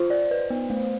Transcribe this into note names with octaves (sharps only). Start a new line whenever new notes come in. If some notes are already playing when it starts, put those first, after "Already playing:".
Already playing: F4 C5
D5
B4
B3
A3